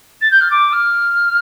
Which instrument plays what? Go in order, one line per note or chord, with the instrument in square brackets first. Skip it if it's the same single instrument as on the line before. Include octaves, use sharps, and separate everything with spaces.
[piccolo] A6
G6
F6
D6
F6